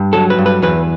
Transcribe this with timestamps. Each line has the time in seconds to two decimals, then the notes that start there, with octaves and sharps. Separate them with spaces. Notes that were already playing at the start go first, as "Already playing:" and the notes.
Already playing: G2
0.13 F#3 A4
0.30 B4
0.38 G2
0.46 B4
0.62 E2 B4